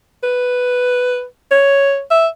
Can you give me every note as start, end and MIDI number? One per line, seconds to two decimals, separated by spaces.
0.23 1.25 71
1.51 2.01 73
2.11 2.27 76